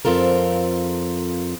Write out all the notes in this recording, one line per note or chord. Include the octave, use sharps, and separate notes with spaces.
F2 C4 F4 A4 A#4